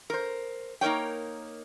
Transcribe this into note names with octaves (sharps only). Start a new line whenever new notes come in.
A#4 C5
A#3 D#4 A#4 C#5 G5